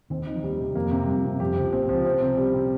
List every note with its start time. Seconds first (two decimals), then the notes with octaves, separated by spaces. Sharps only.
0.10 D#2 D#3 C4
0.27 D#4
0.35 F3
0.43 D#2 D#3 G3
0.60 C3
0.75 F2 F3 A#3
0.91 C3
1.07 G2 F3 G3
1.25 C3
1.40 F2 F3 G4
1.56 C#2 C#3 F3
1.72 A#1 A#2 C4
1.89 C#2 C#3 F3
2.05 C4
2.21 C3
2.37 G3
2.53 C3